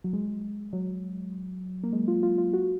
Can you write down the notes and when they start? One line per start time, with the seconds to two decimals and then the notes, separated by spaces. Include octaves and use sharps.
0.04 F#3
0.13 G#3
0.73 F#3
1.84 A#3
1.93 G#3
2.08 F4
2.23 F4
2.38 F4
2.53 F#4